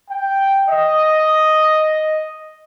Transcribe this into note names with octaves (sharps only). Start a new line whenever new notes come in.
G5
D#5